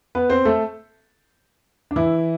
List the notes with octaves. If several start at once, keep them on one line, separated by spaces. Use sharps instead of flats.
B3 B4
C4 C5
A3 A4
D4
E3 E4